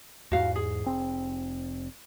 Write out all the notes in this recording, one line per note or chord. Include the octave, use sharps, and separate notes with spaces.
E2 G#2 F#4 F5
G#4
F1 C4